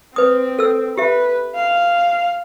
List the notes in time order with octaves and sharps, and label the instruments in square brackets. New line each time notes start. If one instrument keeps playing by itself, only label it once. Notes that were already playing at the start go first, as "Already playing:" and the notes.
[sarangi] C4 [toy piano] B4 D#6
[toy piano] A4 E6
[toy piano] G4 E5 [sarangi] B4
[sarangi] F5